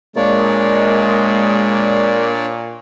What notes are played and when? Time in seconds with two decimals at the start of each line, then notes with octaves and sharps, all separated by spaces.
0.16 A#2 G#3 A#3 D4 C#5 D5